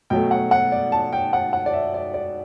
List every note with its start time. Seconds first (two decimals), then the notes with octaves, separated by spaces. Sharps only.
0.10 B2 F#3 A3 G5
0.31 F#5
0.51 F#5
0.72 D5
0.92 A5
1.13 G5
1.33 F#5
1.53 F#5
1.66 D5
1.73 E5
1.94 D5
2.14 D5